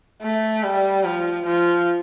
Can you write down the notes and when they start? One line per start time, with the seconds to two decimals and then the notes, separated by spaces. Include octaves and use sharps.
0.22 A3
0.63 G3
1.05 F3
1.46 F3